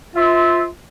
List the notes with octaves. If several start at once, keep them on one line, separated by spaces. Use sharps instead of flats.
F4 C5 E5